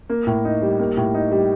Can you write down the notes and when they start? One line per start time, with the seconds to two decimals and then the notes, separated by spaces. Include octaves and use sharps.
0.09 A#3
0.27 A2
0.45 D#4
0.62 G3
0.79 A#3
0.97 A2
1.14 D#4
1.31 G3